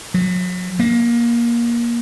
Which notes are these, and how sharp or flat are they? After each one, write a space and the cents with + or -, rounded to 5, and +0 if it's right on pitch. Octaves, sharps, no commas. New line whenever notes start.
F#3 -35
A#3 +20